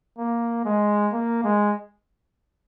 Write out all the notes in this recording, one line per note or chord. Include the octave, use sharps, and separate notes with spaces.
A#3
G#3
A#3
G#3